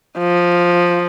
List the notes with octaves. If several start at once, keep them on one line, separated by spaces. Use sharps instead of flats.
F3